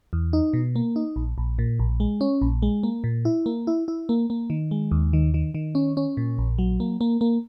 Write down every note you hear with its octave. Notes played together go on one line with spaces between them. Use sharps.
E2
D#4
B2
A#3
D#4
A#1
A#1
A#2
A#1
G#3
C#4
A#1
G#3
A#3
A#2
E4
A#3
E4
E4
A#3
A#3
D#3
G#3
D#2
D#3
D#3
D#3
C#4
C#4
A#2
A#1
F#3
A#3
A#3
A#3